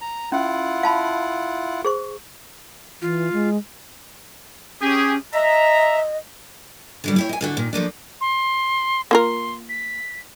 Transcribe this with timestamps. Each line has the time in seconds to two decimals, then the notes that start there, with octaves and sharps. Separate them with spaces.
0.01 A#5
0.32 C#4 E4 F4 F#5
0.83 F5 A5 B5
1.85 G#4 C5 C#6
3.02 E3 F4
3.33 G#3
4.81 C#4 G4 G#4
5.34 D#5 E5 A#5
7.04 D3 F#3 G3
7.16 E4 G4 C#5
7.29 D#5 G#5
7.41 A2 D3 F#4
7.57 A#2 D#3
7.73 F3 A3 A#3 D4
8.21 C6
9.11 A#3 F4 A#4 C6
9.69 B6